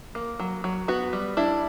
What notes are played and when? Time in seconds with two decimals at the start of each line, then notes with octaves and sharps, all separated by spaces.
0.15 A#3
0.39 F#3
0.64 F#3
0.88 B3 F#4
1.13 G3
1.37 D4 E4